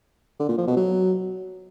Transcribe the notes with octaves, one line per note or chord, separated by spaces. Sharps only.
D3
A#2
F3
B2
F#3